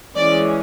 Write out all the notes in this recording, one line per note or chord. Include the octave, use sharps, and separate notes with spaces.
E3 G#3 C#4 D5